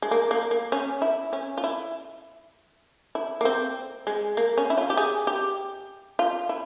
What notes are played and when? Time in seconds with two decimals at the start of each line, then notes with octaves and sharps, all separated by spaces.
0.02 G#3
0.11 A#3
0.31 A#3
0.51 A#3
0.72 C#4
1.02 E4
1.33 C#4
1.57 F4
1.64 E4
3.15 E4
3.41 A#3
3.45 C4
4.07 G#3
4.37 A#3
4.57 C#4
4.70 E4
4.78 F4
4.90 G4
4.97 G#4
5.27 G4
6.19 F4
6.49 E4